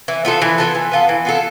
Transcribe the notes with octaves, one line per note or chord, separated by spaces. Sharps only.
E3
B3 F4 A4
E3
B3 F4 A4
E3
B3 F4 A4
E3
B3 F4 A4